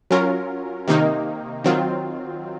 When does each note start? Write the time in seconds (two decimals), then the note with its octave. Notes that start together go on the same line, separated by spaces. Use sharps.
0.11 F#3 C#4 F4 A#4
0.88 C3 D#3 A#3 D#4
1.64 D#3 F#3 C4 F4